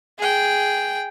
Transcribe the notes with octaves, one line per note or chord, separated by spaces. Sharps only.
G#4 G5